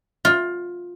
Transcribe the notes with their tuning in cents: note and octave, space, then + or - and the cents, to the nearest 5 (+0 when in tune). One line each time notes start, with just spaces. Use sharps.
F4 +15